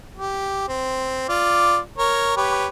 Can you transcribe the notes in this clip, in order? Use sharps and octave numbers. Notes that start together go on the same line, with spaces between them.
G4
C4
F4 D5 D6
A#4 C#5
G4 B4 C#5